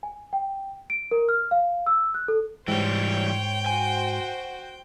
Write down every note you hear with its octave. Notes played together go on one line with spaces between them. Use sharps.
G#5
G5
D7
A#4
F6
F5
E6
F#6
A4
G#2 E3 G3 C5 C#5 G5
F#4 C5 G#5